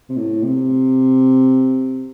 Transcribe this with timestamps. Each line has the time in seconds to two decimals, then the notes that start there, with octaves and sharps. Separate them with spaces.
0.09 C3
0.17 A2
0.43 C3